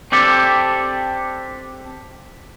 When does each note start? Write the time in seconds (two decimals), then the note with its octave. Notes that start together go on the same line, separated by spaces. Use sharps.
0.12 C4 D4 G4 A4